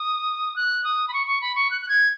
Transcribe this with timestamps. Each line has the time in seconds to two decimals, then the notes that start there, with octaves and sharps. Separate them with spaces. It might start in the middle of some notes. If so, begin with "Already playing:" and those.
Already playing: D#6
0.56 F#6
0.84 D#6
1.08 B5
1.14 C#6
1.27 C#6
1.41 B5
1.55 C#6
1.71 F#6
1.81 F#6
1.89 G#6